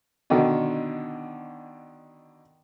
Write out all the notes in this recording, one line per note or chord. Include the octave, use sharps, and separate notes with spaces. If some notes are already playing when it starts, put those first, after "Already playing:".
B2 D3 D#3